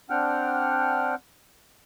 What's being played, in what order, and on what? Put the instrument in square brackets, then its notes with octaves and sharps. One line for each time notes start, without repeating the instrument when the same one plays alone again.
[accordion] C4 D4 F#5 G5 F6